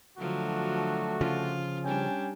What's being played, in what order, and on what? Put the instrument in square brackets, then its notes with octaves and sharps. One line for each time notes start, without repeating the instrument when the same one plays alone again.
[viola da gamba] D3 F3 F#3 [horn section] A3 D4 F#4
[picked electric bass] C#3 F3 [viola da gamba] F4
[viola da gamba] G3 D4 [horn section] C#4 G5 G#5